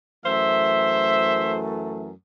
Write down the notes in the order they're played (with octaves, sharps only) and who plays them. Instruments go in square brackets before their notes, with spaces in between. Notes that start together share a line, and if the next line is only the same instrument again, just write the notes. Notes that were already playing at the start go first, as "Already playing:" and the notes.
[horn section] F#2 E3 A3 C5 E5